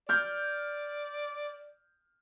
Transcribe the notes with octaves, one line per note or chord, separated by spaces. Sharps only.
D5 F6 G6